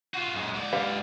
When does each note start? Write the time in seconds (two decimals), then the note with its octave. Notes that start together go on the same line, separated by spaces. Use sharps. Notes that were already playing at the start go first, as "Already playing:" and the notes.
0.14 F4 F#4
0.35 F#2 G#3
0.54 G#2 D5
0.73 G4 B4 F5